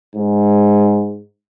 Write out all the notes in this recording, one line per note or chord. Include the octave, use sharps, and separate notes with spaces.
G#2